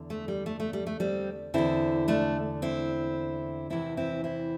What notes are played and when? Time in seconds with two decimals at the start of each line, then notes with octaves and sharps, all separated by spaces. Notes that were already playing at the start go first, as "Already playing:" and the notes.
Already playing: E2 D3
0.10 A3
0.28 G3
0.46 A3
0.60 A3
0.73 G3
0.87 A3
1.00 G3 C4
1.54 E2 D3 C4 E4
2.08 A3 D4
2.62 C4 E4
3.70 E2 C3 E3 C4 E4
3.97 C4 E4
4.24 C4 E4